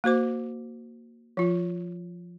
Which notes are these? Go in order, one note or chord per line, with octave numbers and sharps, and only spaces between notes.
A#3 F#4 C5 D6
F3 F4